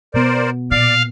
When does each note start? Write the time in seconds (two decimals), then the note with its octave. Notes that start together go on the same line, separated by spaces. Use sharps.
0.14 B2 B3 A#4 C5 D5
0.71 A#2 D5 F5